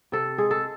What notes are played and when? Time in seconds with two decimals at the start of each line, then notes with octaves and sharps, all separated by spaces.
0.12 C3 A4
0.38 G#3 G#4
0.51 A4